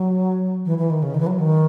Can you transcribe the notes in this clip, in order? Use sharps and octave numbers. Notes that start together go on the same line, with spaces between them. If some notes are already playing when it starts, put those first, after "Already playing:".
Already playing: F#3
E3
E3
D#3
C#3
D#3
E3
F#3
D#3